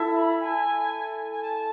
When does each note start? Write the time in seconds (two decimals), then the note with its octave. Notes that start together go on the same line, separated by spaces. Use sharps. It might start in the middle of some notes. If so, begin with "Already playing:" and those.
Already playing: E4 A4 E5
0.15 B5
0.40 G#5
1.33 G#5
1.42 A5